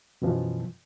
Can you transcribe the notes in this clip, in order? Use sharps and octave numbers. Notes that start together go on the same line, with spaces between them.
F#2 B2 E3 F3